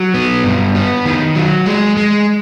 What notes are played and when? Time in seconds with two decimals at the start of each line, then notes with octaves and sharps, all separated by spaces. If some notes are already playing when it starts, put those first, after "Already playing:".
Already playing: F#3
0.14 B3
0.44 G2
0.75 B3
1.05 D#3
1.35 F#3
1.66 G#3
1.97 G#3